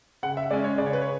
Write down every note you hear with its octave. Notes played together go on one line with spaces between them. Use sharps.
C#3 F#5
E5
G#3 C#4 D5
C#5
C#3 D5
C#5
B4
C#5